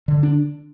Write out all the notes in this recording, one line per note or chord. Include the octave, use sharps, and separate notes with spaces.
D3
D4